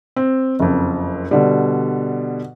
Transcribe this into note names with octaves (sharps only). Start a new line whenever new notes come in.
C4
F#1 F2
B2 D3 G3